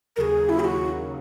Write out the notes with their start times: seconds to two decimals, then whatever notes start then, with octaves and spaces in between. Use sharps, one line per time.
0.16 D#2 C#3 F#3 G#4 A#4
0.49 E4
0.60 G#4
0.64 F#4